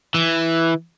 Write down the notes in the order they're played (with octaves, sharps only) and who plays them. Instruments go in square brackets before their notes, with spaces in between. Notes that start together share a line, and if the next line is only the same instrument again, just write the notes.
[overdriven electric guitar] E3